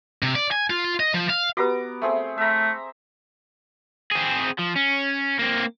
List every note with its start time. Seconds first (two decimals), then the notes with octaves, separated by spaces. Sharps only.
0.23 C3
0.35 D5
0.52 G#5
0.70 F4
1.00 D#5
1.14 F3
1.30 F5
1.57 B3 F#4 G4 B4 A#5 D6
2.02 A3 C4 G#4
2.38 A3 E5 A#5
4.12 C4 G#4
4.59 F3
4.76 C#4
5.39 A#3 C4